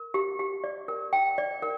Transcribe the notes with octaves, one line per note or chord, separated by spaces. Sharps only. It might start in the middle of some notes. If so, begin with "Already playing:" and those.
Already playing: A#4
G4
G4
D5
A#4
G5
D5
A#4